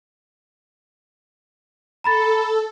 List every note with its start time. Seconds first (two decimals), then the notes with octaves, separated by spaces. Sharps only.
2.04 A4 A#5 B5 A6